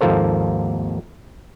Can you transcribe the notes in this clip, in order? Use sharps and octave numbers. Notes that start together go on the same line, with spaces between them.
G#1 D#2 F3 A#3 A4 C5